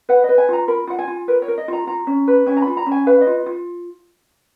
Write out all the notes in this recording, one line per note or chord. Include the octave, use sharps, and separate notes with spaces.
B4 F#5
D#5
B4
G#5
F4 A#5
A#4 B5
F4 F#5
G#5
F4
A#4 B4
C#5
A#4
D#5
F4 A#5
F4 A#5
C#4
B4
C#4 G#5
A#5
F4 B5
A#5
C#4
G#5
B4 F5
D#5
F4
F4